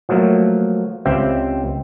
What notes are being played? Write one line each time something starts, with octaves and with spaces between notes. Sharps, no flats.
F3 F#3 A3 A#3
C#2 C4 G4 E5 G5